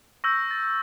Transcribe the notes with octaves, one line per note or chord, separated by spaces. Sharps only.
C#6 E6 G6 A#6
A6